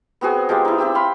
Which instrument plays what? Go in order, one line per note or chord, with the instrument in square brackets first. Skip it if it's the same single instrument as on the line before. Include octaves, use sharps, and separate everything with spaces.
[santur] B3 C4 F#4 G#4
F3 G#3 F4 G4
D#4 E4
C4 E4 G4 E6
F5 B5 C6